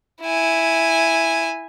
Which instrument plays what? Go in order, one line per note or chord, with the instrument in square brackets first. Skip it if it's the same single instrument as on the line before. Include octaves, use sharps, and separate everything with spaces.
[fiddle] E4 G#5